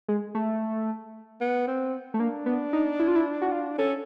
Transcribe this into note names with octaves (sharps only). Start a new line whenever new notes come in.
G#3
A3
B3
C4
A3
A#3 D4
B3
D#4
E4
F4
E4
F#4
F4
C#4 A4